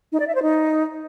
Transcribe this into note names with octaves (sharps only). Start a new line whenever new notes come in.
D#4
D5
E5
C5
D#4